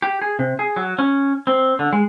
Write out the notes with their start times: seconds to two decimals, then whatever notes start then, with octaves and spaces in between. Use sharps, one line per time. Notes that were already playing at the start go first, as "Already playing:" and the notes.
0.02 G4
0.22 G#4
0.39 C3
0.59 G#4
0.76 F#3
0.99 C#4
1.47 C4
1.79 D3
1.93 G#3